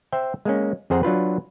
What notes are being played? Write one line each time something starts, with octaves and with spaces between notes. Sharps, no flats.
C5 E5 G5
G#3 A#3 C#4
F2 G#4 C5 F#5 A#5
F#3 D4 F4 B4